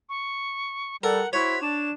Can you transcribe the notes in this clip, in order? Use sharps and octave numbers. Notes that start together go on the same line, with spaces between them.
C#6
G3 A4 A#4 F#5
E4 F#4 C5 C#5 B6
D4 E7